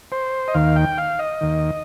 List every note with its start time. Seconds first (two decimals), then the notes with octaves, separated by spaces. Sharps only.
0.12 C5
0.48 D#5
0.54 D#2 D#3 F5
0.76 G5
0.98 F5
1.19 D#5
1.41 D#2 D#3